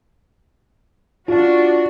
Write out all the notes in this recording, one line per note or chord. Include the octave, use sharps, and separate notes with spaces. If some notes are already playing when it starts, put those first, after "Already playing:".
D4 F4 F#4